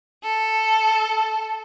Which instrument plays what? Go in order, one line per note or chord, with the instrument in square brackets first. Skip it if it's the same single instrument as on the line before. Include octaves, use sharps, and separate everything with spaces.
[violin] A4